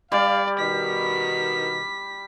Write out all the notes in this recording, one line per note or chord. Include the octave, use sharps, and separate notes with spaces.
G3 D5 F5
B2 D#3 A#4 B6